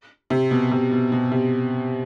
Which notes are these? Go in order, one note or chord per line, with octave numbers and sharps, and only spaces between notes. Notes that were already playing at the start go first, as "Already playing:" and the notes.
C3
B2
C3
B2
B2
C3